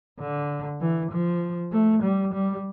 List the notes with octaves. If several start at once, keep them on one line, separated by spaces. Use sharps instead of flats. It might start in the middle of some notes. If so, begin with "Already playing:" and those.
D3
E3
F3
A3
G3
G3